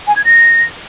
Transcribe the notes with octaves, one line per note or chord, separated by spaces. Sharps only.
G#5
G#6
A#6